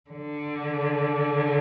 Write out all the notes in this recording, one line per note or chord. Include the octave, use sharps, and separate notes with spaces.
D3